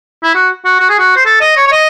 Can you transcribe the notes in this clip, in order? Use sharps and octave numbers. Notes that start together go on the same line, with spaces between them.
E4
F#4
F#4
F#4
G#4
F#4
C5
A4
D#5
C#5
C#5
D#5